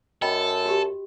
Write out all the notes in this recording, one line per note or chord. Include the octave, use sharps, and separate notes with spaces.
F#2 A4 D#5 G5 B5
F#4 G4